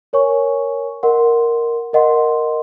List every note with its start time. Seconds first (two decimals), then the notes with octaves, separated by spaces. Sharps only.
0.13 A#4 C#5 G#5 C#6
1.03 A#4 D#5 F#5 C6
1.93 A#4 D#5 F#5 C6